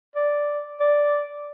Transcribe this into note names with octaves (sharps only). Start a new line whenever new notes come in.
D5
D5